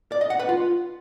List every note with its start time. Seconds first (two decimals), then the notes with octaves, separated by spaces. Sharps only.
0.12 D5
0.21 D#5
0.30 F#5
0.40 B4
0.49 F4